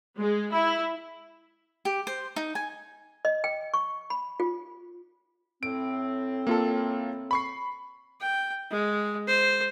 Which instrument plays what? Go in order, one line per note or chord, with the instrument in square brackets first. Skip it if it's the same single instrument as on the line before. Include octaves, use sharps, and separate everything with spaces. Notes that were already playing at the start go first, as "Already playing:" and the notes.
[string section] G#3
E4
[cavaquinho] G4
C5
D#4
G#5
[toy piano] D#5
G5
C#6
B5
F4
[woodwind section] A2 C4 [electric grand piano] D7
[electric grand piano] A#3 F4 A4
B5 C#6 C7
[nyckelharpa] G5
G#3
C5